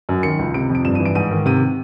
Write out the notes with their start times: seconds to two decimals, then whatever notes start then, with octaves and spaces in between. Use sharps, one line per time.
0.09 F#2
0.23 D#3 C#7
0.39 C#2
0.54 C3 D7
0.70 F2
0.75 D7
0.85 G2 E7
0.95 E3 D#7
1.05 D7
1.15 G#2 D#7
1.31 D#3
1.46 C3 D#7